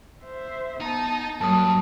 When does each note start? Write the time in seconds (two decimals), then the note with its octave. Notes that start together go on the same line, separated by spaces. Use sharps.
0.23 C5 E5
0.80 B3 D#4 A5 A#5
1.41 G2 F#3 A#3 A#4 A5 D#6